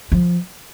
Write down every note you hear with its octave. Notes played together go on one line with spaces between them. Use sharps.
F3